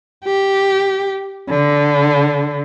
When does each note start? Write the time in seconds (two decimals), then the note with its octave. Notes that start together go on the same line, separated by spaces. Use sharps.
0.25 G4
1.50 D3